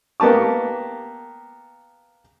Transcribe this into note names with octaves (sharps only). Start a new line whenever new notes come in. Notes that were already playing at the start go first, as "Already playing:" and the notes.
A#3 B3 G4 A5 D6